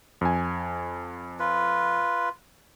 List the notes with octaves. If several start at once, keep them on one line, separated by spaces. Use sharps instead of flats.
F2 G#5
F4 B4